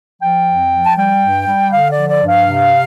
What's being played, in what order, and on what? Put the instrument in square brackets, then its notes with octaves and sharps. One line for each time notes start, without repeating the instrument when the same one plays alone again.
[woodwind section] F3 G5
F2
F3
A5
G3 G5
G2
G3
D3 F5
D5
F3
D5
G2
F5
C3